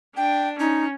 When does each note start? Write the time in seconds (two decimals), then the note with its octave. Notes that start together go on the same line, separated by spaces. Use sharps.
0.16 D4 G5
0.59 C#4 D#4